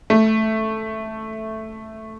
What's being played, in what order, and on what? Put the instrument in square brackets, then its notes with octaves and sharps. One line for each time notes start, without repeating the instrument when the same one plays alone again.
[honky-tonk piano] A3